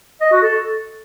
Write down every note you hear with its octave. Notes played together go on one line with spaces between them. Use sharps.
D#5
F#4
A4